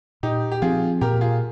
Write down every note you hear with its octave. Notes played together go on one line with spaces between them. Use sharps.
A#2 D#4 G4
G4
F3 C4 F4 G#4
A#2 G4 A#4
F4 G#4